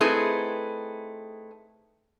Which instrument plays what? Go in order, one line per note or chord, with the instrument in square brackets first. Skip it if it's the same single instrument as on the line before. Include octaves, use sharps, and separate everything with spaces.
[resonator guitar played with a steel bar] A3 C4 D#4 E4 G#4 B4